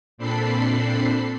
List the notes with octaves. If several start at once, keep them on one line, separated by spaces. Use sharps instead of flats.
A#2 C4 D4 A4 B5 C7